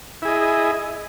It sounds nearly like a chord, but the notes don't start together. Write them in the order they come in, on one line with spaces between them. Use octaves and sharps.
E4 G#4 D#5